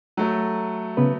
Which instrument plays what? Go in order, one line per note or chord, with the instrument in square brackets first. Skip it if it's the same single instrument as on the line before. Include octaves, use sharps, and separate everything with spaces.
[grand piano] F#3 A3
[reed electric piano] C#3 B3 B4